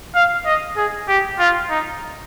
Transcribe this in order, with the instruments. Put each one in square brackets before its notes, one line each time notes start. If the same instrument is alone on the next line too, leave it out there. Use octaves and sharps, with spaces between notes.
[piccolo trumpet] F5
D#5
G#4
G4
F4
D#4